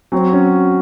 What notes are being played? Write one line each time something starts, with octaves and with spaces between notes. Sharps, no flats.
F#3 C4
C#4